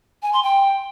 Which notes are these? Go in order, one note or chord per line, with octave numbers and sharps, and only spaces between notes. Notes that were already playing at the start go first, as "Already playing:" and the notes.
G#5
C6
G5